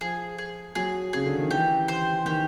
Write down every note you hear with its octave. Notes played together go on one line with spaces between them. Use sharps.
F3 G#4
G#4
F#3 G#4
C#3 G#4
D3
D#3
E3 G4
C5
D#3 G4